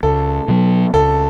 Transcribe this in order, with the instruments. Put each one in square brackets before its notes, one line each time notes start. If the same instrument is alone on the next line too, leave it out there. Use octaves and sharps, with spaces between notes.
[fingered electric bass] C#2 [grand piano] A4
[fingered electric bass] B2 F#3
[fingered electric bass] C#2 [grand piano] A4